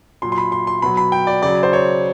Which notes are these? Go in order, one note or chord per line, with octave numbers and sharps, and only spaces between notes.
A#2 F#3 C6
C6
B5
C6
C6
B2 F#3 B5
B5
G5
D5
C#3 F#3 D5
C5
C#5